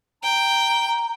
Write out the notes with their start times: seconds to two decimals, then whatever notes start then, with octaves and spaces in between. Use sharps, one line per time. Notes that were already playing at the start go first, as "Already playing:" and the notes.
0.23 G5 A#5